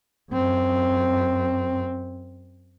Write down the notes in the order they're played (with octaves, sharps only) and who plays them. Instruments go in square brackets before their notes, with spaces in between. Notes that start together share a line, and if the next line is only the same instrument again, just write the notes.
[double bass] F#2 C4